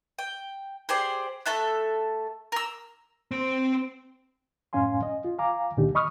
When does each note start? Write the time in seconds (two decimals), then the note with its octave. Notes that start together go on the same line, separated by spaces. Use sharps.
0.19 G5
0.89 G4 G#4 C5 D5
1.46 A3 A4 E5 F#6
2.52 A#4 E6
3.31 C4 C5
4.73 F#2 A2 C#4 F5 G#5 C6
5.03 D#5
5.25 F4
5.38 F5 G#5 A#5 D6
5.77 C#2 A#2 D3 D#3 D#4 G4
5.95 D#5 B5 C#6 D#6 F6